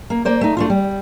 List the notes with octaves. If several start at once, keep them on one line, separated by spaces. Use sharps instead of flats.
A#3
A#3 C5 D5
A3 D#4
A3 D4 F4
G3